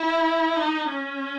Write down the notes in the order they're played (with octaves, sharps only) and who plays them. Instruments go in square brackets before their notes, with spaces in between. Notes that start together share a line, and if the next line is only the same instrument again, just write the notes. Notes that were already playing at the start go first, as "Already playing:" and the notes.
Already playing: [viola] E4
D#4
C#4